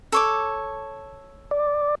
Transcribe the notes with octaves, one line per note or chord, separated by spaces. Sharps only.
A4 C#5 D6
D5